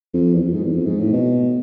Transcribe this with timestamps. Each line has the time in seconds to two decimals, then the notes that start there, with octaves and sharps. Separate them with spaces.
0.14 F2
0.34 E2
0.44 F2
0.53 G#2
0.63 E2
0.73 F2
0.86 G#2
1.00 A2
1.12 B2